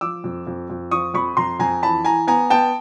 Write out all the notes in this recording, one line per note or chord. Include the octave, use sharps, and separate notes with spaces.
F3 D6 E6
F2
F2
F2
F3 C#6 D#6
F2 B5 C#6
F2 A#5 C6
F2 G#5 A#5
E3 A5 B5
E3 G#5 A#5
B3 G#5 A#5
B3 G5 A5